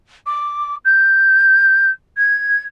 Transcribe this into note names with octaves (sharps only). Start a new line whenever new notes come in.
D6
G6
G#6